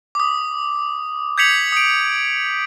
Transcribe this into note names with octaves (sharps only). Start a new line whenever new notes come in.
D6 D#6
G6 G#6 B6 C#7 F7 F#7
D#6 D7